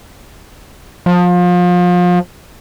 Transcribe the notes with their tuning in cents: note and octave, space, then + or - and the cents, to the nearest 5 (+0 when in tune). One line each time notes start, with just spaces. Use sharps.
F3 +30